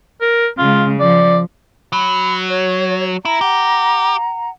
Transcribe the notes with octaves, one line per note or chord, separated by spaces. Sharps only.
A#4
C#3 G#3 F4
F3 D5
F#3 B5
C#5
E4 A#5
G4 F#5